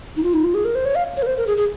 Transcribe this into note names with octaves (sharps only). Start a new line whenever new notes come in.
D#4
F4
D#4
F4
G#4
A#4
C5
C#5
F5
C#5
A#4
C5
A#4
G#4
G#4